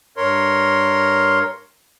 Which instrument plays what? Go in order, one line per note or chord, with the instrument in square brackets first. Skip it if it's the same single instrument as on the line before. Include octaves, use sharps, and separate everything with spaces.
[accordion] G2 A#4 C#5 C6